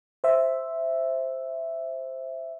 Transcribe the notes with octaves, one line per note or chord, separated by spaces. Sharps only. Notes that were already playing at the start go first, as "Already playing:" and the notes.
C5 E5